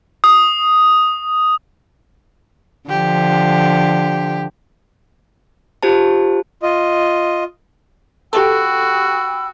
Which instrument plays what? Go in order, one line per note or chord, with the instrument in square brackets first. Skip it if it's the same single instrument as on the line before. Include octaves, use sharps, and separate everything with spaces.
[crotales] D#6
[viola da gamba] D3 F3 [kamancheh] G4
[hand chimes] F4 G4 C5 A5
[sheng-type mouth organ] F4 D#5
[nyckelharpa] F#4 [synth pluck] G4 A4 [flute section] G5 B5 E6